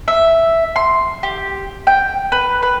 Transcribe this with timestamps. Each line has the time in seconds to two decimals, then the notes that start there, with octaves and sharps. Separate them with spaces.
0.08 E5
0.76 C6
1.23 G4
1.87 G5
2.32 B4
2.63 B4